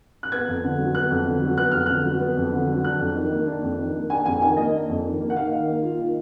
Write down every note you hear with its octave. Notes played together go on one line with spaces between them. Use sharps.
F#6
B3 G#6
F2
D3
F#3
B3 F#6
F2
D3
F#3
B3 F#6
F2 F6
D3 F#6
F#3
B3
F2
D3
F#3
D4 F#6
F2
D#3
A#3
D4
F2
D#3
A#3
D4 G#5
F2 G#5
D#3 G#5
A#3 D#5
D4
F2
D#3
A#3
F#5
D#3 F5
D#3
A#3
F4
D#3